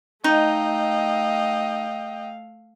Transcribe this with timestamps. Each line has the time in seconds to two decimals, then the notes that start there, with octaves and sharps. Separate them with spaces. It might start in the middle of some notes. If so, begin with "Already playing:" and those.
0.24 A3 D#4 D#5 F5 G5